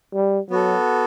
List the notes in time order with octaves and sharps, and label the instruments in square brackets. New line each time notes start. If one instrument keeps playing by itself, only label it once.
[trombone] G3
[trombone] F#3 [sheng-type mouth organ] B3 F#4 A4